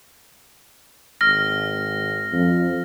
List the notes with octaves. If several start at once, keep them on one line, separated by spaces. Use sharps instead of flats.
G#1 F6 A#6
F2